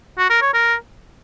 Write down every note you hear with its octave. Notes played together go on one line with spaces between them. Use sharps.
F#4
A#4
C#5
A#4